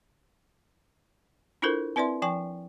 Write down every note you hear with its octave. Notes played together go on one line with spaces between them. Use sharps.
D4 E4 F4 A4 A#4 C5
C4 E4 B4 D5 E5 C6
F3 G5 G#5 C#6